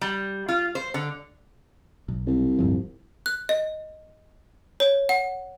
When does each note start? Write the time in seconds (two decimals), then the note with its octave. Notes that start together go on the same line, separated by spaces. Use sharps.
0.01 G3
0.48 F4
0.75 C5
0.94 D3
2.08 B1
2.27 C2
2.59 D1 G2 F3
3.26 F#6
3.49 D#5
4.80 C#5
5.09 F#5